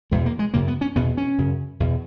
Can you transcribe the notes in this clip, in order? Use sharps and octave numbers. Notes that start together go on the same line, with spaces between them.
E2 B2 G#3
A#3
G#3
F#2 C#3 A#3
B3
C#4
E2 B2 B3
C#4
F#2 C#3
E2 B2